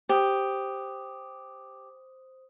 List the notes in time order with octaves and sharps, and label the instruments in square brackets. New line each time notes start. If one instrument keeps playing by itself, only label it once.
[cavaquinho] G4 [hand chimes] C5 D#6